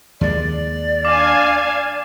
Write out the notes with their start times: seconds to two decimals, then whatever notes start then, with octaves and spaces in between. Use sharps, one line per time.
0.21 D#2 G#3 D5
1.05 D4 F5 G#5 D6